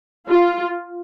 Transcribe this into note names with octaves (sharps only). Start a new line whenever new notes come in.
F4